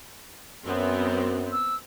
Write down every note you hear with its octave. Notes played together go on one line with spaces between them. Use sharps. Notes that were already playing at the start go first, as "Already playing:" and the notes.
F#2 B3 C4
E6